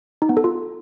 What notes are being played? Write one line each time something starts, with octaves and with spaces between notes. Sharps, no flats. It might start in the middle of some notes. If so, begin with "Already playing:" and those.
D#4
B3
A4
F4